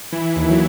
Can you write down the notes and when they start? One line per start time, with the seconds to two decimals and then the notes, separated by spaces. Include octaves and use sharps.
0.12 E3 E4
0.36 D#2 E4
0.50 F#3